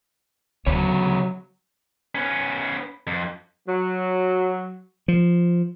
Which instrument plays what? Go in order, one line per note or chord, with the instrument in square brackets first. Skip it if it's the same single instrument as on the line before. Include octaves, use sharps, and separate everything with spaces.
[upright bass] D2 [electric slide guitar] C#3 B3 C#5 [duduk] F#3
[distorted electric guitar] B3 C#4
F2
[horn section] F#3
[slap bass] F3